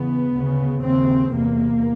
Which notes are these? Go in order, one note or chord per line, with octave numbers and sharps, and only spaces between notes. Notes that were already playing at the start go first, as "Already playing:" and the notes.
Already playing: E2 C#3 B3
D2 C#3
D#2 C#3 C4
E2 C3 A#3